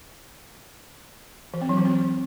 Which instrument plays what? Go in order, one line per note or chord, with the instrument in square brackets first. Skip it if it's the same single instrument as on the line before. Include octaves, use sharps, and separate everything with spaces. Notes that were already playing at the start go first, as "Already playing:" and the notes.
[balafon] E3
C4
F#3
E3
C4